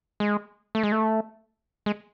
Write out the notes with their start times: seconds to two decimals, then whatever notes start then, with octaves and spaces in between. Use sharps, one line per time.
0.20 G#3
0.75 A3
0.83 G#3
0.92 A3
1.86 G#3